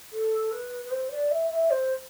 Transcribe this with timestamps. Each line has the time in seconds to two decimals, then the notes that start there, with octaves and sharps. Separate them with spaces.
0.13 A4
0.52 B4
0.85 B4
0.91 C5
1.11 D5
1.31 E5
1.51 E5
1.71 C5